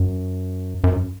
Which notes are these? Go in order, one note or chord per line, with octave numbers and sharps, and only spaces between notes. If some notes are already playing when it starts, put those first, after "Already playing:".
Already playing: F#2
F#2